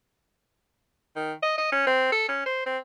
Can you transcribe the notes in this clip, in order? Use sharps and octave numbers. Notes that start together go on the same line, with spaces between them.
D#3
D#5
D#5
C#4
C4
A4
C#4
C5
C4